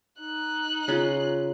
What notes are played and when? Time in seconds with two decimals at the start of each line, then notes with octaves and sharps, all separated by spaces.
0.20 D#4 F#6
0.88 C#3 F4